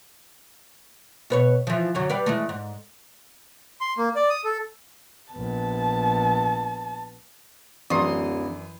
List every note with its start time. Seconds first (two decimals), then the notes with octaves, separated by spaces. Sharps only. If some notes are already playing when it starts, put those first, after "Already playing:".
1.30 B2 B4 C#5
1.67 E3 F3
1.94 F#2 D3 F#3
2.10 G3 B4 D5
2.26 E3 G#3 A3
2.49 G#2
3.81 C6
3.98 A#3
4.16 D5
4.30 D#6
4.44 A4
5.33 A#1 B3 A5
7.90 D1 F#2 E3 D5 C6 D#6